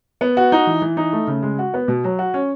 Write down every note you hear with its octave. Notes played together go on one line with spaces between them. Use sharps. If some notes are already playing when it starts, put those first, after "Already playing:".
B3
F#4
D#4
E3
E3
D#4
A3
C#3
G#3
F#4
B3
B2
F#3
F#4
C#4